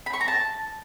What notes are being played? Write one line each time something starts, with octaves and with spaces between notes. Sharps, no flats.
B5
C#6
A#5
A5